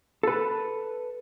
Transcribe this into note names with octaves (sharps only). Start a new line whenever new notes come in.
A4 B4